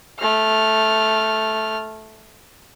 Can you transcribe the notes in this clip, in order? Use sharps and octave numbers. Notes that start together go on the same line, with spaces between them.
A3 F6